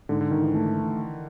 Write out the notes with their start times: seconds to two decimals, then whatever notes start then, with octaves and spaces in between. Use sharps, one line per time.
0.09 G#2 D3
0.21 D3
0.31 G#2 D#3
0.42 E3
0.54 A3